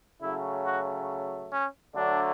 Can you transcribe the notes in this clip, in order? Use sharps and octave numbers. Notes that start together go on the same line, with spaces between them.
C#3 F#3 A3 E4
F#4
C#4
D3 F#3 A3 D4